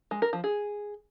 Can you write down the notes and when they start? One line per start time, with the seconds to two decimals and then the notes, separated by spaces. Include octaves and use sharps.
0.11 G#3
0.22 A#4
0.33 F3
0.44 G#4